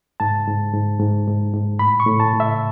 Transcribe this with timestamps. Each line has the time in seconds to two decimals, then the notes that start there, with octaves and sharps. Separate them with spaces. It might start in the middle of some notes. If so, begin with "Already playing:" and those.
0.20 G#2 A5
0.47 G#2
0.74 G#2
1.00 G#2
1.27 G#2
1.53 G#2
1.79 A2 B5
2.00 C#6
2.06 A2
2.20 A5
2.33 A2
2.40 E5